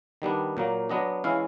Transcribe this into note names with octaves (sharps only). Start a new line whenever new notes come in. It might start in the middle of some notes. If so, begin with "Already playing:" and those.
D#3 G3 B3 D4
A#2 F#3 A#3
F#3 B3 D4 D#5
E3 G#3 C#4 E4 F5